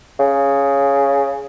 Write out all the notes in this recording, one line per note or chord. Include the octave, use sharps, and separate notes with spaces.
C#3